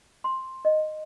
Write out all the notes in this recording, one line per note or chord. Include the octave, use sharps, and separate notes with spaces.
C6
D#5